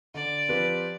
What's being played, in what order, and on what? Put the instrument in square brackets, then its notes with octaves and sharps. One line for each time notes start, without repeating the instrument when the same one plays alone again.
[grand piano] D3 [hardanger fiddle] D5
[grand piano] F3 C4 G4 B4